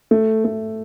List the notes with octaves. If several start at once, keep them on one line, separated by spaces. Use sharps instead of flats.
A3
A3